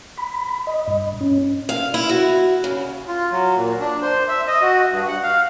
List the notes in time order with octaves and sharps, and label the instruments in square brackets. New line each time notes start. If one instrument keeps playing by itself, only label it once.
[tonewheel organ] B5
D#5
G2
C#4
[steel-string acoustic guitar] F5
E4
F#4
C#3
[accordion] F4
F#3
A#2
D4
C5
E5
D#5
F#4
G2
F#5
F5